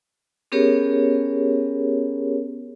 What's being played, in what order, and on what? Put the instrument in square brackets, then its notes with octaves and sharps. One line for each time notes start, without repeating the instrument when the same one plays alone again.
[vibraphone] B3 C#4 G4 G#4 A#4 C#5